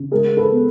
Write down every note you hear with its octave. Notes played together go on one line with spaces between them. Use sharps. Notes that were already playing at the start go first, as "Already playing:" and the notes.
Already playing: C#3
G#3 G#4 A#4
A4 B4
B3